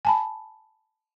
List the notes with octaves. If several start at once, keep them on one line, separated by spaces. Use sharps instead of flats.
G#5 A5 B5